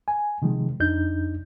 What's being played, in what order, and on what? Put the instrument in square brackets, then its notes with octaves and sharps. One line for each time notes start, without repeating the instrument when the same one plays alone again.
[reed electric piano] G#5
C3 D#3 F3 G#3
F2 D4 D#4 G6